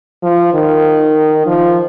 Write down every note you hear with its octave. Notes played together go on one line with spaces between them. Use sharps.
F3
D#3
F3